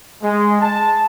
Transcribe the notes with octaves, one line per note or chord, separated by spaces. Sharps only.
G#3
A5